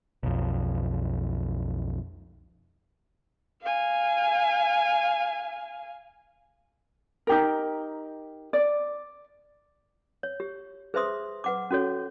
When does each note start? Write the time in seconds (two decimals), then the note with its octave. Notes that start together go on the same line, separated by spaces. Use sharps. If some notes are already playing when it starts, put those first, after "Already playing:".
0.23 B1 F2
3.62 F5 G#5
7.27 D#4 G4 A#4
8.53 D5
10.23 C#5
10.40 G4
10.94 G#4 B4 C5 E5 C6 D#6
11.44 B4 F#5 D6
11.71 C#4 F#4 A4 C#5